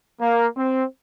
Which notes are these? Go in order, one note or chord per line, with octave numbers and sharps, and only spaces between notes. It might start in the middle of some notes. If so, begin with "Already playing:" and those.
A#3
C4